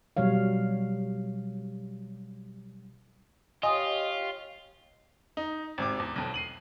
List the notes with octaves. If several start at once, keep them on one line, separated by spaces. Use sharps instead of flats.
B2 F#3 G3 C#5 F5
F4 G4 C#5 D#5 G#5 D#6
D#4
G#1 C3 D6
E2
B1 F2
C7 D#7 F#7